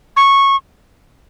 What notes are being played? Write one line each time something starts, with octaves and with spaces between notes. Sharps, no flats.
C#6